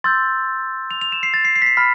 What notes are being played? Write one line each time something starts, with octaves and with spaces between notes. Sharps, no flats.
C6 E6 G6 A6
F7
F7
E7
C7
A6
C7
C7
B6
C7
B5 F6 B6